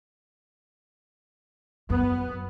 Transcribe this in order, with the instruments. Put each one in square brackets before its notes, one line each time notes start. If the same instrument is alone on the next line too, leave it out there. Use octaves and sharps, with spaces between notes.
[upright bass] F#2 [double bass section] B3